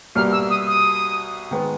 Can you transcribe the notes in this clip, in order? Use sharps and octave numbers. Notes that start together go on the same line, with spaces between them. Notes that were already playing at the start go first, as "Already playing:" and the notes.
C2 B2 G3 A#3 F6
E6
D#6
D#6
D#3 G#3 B3